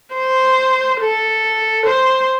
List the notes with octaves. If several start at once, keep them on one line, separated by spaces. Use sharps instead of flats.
C5
A4
C5